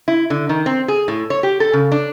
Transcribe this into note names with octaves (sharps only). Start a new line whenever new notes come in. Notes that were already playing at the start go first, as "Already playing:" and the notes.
E4
D3
D#3
C4
G#4
A2
C#5
G4
A4
C#3
D4